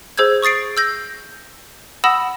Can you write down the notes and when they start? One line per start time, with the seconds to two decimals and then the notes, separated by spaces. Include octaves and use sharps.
0.18 G#4 C5 E6 G6 G#6
0.42 C#6 D#6 A6 C7 D7
0.77 E6 G6 A#6
2.04 F#5 B5 D#6 E6 A#6 E7